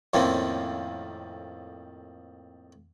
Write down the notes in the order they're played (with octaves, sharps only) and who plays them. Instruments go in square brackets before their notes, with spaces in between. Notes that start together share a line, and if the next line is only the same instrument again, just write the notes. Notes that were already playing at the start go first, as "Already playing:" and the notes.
[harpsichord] F2 A2 D#3 A#3 C4 C#4